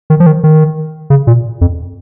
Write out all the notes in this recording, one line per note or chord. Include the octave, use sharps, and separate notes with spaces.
D#3
F3
D#3
D#3
C#3
A#2
F2